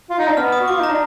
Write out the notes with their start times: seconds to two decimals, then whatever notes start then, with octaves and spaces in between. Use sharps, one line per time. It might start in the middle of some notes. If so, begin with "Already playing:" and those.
0.10 F4
0.19 D#4
0.28 D4
0.37 B3 F6
0.52 D#6
0.60 F#4
0.68 F4 D6
0.80 D#4 A#5
0.89 D4